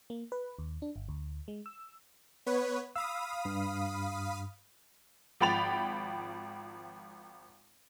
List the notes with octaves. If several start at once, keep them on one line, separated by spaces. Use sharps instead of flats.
A#3
B4
D#2
D4
G1
D2
G#3
E6
B3 B4 C#5
F5 B5 D#6 E6
G2
G#1 F3 G5 B5 A6 F7